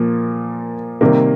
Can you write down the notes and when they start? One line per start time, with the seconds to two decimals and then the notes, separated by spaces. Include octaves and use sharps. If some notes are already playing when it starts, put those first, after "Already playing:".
Already playing: A#2 F3 A#3
1.01 C3 D#3 G3 A#3